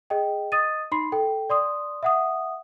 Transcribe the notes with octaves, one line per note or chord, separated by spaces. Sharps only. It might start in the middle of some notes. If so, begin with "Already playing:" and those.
G#4 D#5 G5
D#5 D#6 A6 D#7
D#4 B5 C6 C7
A4 G5
D5 C6 D#6
E5 F#5 D#6